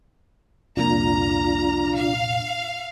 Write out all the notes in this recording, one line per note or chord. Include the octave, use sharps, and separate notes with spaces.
C2 F2 A#2 D4 F4 A#5
F5